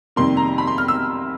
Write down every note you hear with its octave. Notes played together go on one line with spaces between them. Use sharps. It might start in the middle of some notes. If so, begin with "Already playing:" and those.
F2 C3 D#3 G3 A#3 C6
A#5
B5
C6
F6
E6